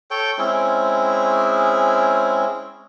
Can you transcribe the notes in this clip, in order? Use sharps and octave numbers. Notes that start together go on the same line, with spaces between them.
A4 C#5 G5
G#3 C4 C#4 E4